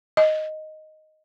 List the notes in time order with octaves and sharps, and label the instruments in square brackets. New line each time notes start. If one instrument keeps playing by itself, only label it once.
[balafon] D#5